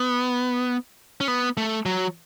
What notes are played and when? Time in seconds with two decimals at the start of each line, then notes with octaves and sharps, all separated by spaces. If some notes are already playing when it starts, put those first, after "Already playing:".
Already playing: B3
1.21 C#4
1.28 B3
1.57 A3
1.86 F#3